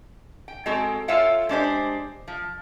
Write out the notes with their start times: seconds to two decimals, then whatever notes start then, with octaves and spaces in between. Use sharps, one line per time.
0.48 G5
0.66 G#3 C4 F#4 A4
1.08 F4 A4 C#5 E5 F5 G5
1.49 G#3 D4 G4 C5
2.28 F3